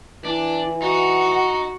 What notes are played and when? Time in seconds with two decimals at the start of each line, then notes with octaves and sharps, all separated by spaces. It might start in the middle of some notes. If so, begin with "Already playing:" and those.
0.25 E3 D4 E4
0.82 D#4 F#4 F#5